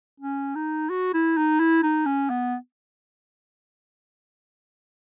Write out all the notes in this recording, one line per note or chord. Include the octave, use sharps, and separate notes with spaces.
C#4
D#4
F#4
E4
D#4
E4
D#4
C#4
B3